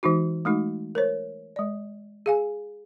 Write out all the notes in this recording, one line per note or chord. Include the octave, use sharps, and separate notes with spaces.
E3 G#3 D#4 F#4
G#3 A3 D#4 F#4
A#4 C5 C#5
G#3 D5
G#4 F5 G#5